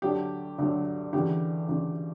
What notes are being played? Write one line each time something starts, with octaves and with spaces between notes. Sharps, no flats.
D2 D3 F#3 G4
D2 D3 F#3
D2 C#3 E3 G4
D2 C#3 E3